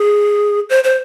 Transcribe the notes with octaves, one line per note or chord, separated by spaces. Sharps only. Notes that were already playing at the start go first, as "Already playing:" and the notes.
Already playing: G#4
C5
C5